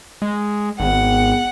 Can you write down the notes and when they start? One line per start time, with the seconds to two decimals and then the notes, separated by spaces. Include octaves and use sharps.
0.22 G#3
0.80 G#1 B3 G#4 F#5 G5